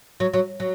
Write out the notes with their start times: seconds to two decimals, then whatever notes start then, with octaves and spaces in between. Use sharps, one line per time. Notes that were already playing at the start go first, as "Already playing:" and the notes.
0.20 F#3
0.34 F#3
0.60 F#3